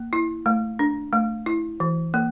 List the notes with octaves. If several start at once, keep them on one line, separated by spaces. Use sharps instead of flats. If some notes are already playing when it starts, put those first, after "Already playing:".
Already playing: A#3
E4
A3
D4
A3
E4
E3
A#3